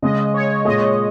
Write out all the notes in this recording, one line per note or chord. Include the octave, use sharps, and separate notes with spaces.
C#3 G#3 C#4 D#5
C#5
A#2 G#3 F4 G#4 D#5